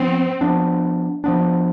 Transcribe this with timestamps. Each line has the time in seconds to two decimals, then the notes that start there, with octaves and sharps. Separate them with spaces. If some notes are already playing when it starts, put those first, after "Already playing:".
Already playing: F3 B3 C4
0.41 F3 B3 D4
1.24 F3 B3 D4